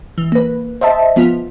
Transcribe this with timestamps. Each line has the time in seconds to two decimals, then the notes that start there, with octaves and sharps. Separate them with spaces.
0.18 E3
0.32 A#3 B4
0.81 C5 D#5 E5 A5
1.16 F3 B3 F4